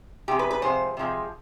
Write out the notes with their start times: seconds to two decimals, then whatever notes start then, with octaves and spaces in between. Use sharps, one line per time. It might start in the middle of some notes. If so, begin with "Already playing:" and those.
0.28 C3 F3 G#3 G4
0.39 B4
0.51 B4
0.62 C3 F3 G#3 C5
0.97 C3 F3 G#3